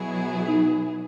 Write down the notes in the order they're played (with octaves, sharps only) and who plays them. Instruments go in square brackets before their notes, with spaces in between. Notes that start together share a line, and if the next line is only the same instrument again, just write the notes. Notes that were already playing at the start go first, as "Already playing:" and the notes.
Already playing: [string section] B2 F#3 B3 E4 G#4
[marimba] D#4